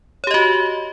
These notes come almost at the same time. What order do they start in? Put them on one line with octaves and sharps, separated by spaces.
C#5 G4 D#5 F#4